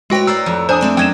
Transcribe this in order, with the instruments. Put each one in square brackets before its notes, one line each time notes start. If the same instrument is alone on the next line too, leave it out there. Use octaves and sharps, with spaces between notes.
[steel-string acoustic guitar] A2 B4 C#5 [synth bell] G#3 F#4 G5
[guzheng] A#4 C5 D5 [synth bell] E6
[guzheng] F2
[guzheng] D4 [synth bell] C5 G#5 D#6
[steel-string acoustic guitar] A3 C4 D5
[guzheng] F#2 D#5 [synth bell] G5 G#6 E7